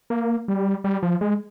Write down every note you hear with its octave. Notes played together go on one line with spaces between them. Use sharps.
A#3
G3
G3
F3
G#3